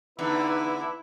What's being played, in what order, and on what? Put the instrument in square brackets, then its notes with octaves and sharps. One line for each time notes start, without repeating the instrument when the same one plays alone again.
[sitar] E2 D3 [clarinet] D#4 [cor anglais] E4 [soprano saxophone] B4